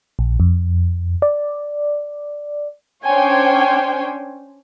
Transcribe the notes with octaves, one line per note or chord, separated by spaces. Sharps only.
A#1
F2
D5
C#4 D4 C5 C#5 G5 G#5